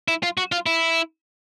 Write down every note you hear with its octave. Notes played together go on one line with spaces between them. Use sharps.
E4
F4
F#4
F4
E4